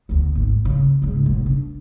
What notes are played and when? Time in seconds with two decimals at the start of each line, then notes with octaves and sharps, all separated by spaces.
0.09 D2 B3
0.35 G#1
0.65 C#3
1.02 G#2 C#3
1.26 B1 C#3
1.46 D4